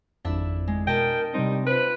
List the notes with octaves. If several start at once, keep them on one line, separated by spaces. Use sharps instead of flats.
G#1 F2 D4 E4 E5
G#3
B2 A#4 D#5 G5 A5
C3 G3 C4 D#4
F4 B4 C5 B5